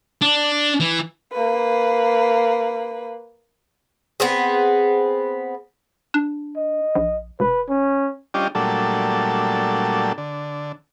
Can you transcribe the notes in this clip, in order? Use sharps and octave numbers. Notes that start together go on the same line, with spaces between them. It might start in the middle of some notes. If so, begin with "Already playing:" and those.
D4
E3
A#3 B4
B3 C4 G#4
D4
D#5
A#1
E1 B4
C#4
G3 C#4 D4 F4 G4 D#5
A#2 F#3 G3 A3 D4 A4
D3